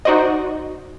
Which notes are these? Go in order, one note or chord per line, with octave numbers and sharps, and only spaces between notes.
D#4 F#4 C5 D5 D#5